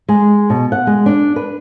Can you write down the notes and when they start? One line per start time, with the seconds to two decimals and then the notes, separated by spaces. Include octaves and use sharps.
0.09 G#3
0.50 B2
0.72 F#5
0.87 G#3
1.06 D4
1.36 B4